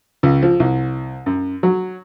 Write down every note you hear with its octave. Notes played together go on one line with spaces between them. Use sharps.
C#2
F3
C2
F#2
F#3